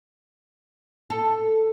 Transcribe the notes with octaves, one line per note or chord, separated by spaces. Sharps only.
A4